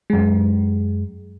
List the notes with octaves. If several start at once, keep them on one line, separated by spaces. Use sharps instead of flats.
F#2 G#3